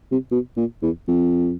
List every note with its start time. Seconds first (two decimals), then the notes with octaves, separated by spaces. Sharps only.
0.11 C3
0.31 B2
0.57 A#2
0.82 E2
1.08 F2